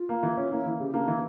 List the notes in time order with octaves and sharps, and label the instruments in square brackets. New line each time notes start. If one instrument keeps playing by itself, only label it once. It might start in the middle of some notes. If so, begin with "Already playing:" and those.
Already playing: [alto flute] F4
[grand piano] A#3
E3
C#4
[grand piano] A#3 [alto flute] E4
[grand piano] E3
[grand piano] C#3 [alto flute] G4
[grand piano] A#3 [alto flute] D4
[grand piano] E3 [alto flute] E4